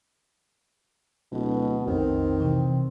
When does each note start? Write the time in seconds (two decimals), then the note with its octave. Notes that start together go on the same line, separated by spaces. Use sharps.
1.32 D1 B2
1.87 B1 F2 D#3 C4
2.40 C3 E3